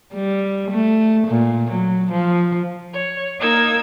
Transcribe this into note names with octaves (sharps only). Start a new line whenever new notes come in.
G3
A3
A#2
F#3
F3
C#5
A#3 D#4 A#4 E6 G#6